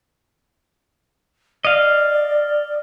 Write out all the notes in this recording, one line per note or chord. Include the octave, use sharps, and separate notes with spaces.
D5 D#5 F5